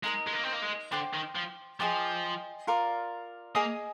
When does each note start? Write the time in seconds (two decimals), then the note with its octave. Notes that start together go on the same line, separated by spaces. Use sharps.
0.03 G#3 D#4 A#4 D#5
0.27 G#3
0.33 A#3
0.43 C4
0.53 A#3
0.62 G#3
0.92 D3 C5 G5 D6
1.13 D#3
1.35 F3
1.80 F3 G#4 D#5 G5 D6
2.67 F4 A#4 D5
3.55 A#3 G#4 D#5 G#5 D#6